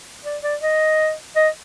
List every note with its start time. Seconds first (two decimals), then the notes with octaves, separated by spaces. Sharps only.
0.25 D5
0.43 D5
0.61 D#5
1.36 D#5